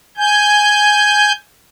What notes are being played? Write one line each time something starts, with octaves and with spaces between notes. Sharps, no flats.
G#5 G6